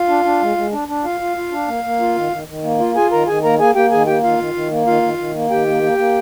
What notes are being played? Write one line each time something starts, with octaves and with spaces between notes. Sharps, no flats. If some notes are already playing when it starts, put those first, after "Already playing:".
Already playing: F4 F5
D4
D4
G#3
G#3
D4
D4
F4 F5
F4
F4
D4
A#3
A#3
F4
D#3
D#3
D#3
A#3
F4
F4 G#4 G#5
D#3 A#4 A#5
D#3 G#4 G#5
A#3 A#4 A#5
A#3 G#4 G#5
A#3 G4 G5
D#3 G#4 G#5
A#3 G4 G5
D#3 F4 F5
D#3
D#3
A#3
D#3 F4 F5
D#3
D#3
A#3
D#3 G4 G5
A#3
A#3
A#3